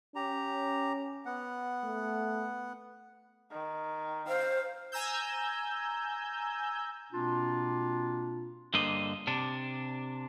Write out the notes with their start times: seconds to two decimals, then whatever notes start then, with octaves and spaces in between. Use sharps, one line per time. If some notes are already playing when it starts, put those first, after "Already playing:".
0.15 C#4 G4 A#5
1.26 B3 F#5
1.84 A3
3.51 D#3
4.28 C5 F5
4.92 G#5 A#5 E6 G6
7.12 B2 A#3 C4 D4 F4
8.74 G2 D3 A#3 C5 D#5
9.27 C3 D4